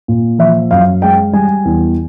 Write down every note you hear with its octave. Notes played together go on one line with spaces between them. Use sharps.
A#2
F3 E5
F#2 F5
G#3 G5
G3 G#5
E2